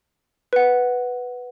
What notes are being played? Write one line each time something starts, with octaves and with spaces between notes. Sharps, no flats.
B4 F#5